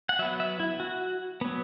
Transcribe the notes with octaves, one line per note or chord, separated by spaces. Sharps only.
F#5
F#3 B3 E5
E5
E4
F#4
F#3 B3